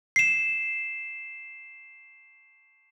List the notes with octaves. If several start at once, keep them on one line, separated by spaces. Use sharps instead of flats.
C7 E7